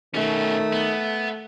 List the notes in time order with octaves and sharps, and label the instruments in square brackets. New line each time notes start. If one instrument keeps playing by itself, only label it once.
[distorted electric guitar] B2 C#4 [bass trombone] D#3 [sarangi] A3
[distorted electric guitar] B3